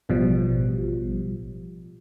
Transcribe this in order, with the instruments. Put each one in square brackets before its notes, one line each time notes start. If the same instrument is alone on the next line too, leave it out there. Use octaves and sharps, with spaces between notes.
[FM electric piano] A1 B2 F3 G3